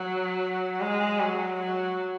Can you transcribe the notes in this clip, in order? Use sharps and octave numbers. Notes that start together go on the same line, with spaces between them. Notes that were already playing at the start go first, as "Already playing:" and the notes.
Already playing: F#3
G#3
F#3
F#3